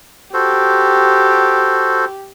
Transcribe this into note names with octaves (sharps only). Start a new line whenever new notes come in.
F#4 G4 A4 C5